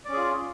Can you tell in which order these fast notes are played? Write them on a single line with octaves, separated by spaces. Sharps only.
D5 C#4 G#4 F4